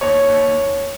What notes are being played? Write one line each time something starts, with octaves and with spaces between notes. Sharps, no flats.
D#2 C#5
D#2